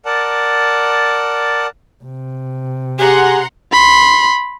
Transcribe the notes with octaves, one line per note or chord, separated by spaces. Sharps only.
A#4 D5 F#5 A5
C3
G4 G#4 F#5 A#5 C6
B5 C6